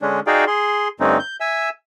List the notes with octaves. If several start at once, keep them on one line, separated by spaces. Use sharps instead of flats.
D3 G#3 C#4 D4
D#4 F#4 G#4 D5 F5 G5
G#4 C6
G2 D3 A3 C4 C#4 D#4
G6
E5 G#5 E6